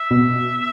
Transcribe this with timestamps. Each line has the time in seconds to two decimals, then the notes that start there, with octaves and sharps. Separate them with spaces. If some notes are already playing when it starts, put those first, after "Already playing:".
Already playing: E5
0.11 B2